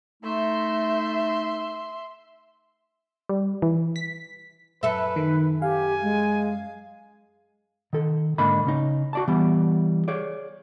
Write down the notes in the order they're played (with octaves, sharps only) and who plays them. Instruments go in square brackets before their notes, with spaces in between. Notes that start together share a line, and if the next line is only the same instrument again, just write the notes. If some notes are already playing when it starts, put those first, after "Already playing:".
[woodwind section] A3 D#4 [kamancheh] E5 C6
[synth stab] G3
E3
B6
[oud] F#2 A4 E5 [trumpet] B4
[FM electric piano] D#3
[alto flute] G4 [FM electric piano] F5 [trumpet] G#5
[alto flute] G#3
[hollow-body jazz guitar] D#3 A4
G#2 D3 A#3 D4 D#5 B5
C#3 C#4 D#4
F#4 D5 A5
E3 G3 B3
G#4 C#5 D5